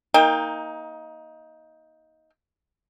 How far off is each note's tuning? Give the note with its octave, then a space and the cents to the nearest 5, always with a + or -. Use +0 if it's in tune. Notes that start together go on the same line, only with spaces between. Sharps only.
A#3 +0 D#4 +20 G5 +30